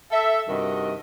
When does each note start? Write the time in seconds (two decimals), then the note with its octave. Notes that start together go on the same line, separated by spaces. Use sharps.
0.12 A4 E5
0.48 G2 C3 D#3 F#4 D#5